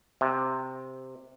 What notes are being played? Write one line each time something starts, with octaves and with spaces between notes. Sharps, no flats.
C3